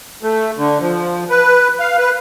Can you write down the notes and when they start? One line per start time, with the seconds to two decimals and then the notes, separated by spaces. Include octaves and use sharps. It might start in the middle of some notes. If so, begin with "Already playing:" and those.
0.23 A3
0.57 D3
0.81 F3
1.30 B4
1.80 F5
1.98 B4